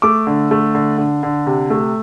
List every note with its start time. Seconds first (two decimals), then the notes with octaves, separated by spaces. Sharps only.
0.02 A3 D6
0.27 D3
0.51 A3
0.75 D3
0.98 D3
1.23 D3
1.47 C3
1.70 A3